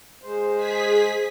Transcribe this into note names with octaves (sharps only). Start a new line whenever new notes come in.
G#3 C5
G#4 B6